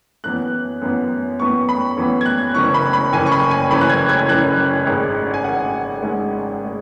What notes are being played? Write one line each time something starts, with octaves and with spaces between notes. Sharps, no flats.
F#2 E3 B3 F#6
F#2 E3 B3
F#2 E3 B3 C#6
B5
F#2 E3 B3
G#6
F#6
F#1 F#2 E3 C#6
B5
B5
F#1 F#2 E3 G#5
C#6
B5
G#5
F#1 F#2 E3 B5
F#6
G#6
G#6
F#1 F#2 E3 F#6
G#1 G#2 G#3
G#5
G#1 G#2 G#3 F#5
G#1 G#2 G#3
G#3